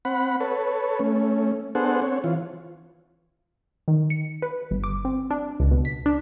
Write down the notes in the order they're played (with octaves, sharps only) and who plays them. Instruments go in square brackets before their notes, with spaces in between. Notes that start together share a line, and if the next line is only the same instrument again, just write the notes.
[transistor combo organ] C4 F#5 B5
A4 B4 C#5
A3 C#4
B3 D4 G#4 A4 C5 F#5
C4 C#5
E3 F4
[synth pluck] D#3
C#7
B4
G1
D6
C4
D4
C#2
B2
B6
D4